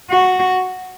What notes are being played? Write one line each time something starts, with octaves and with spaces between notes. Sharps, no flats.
F#4